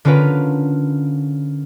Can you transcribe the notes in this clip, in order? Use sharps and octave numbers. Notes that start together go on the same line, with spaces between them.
D3 C#4 F4 A#4 B4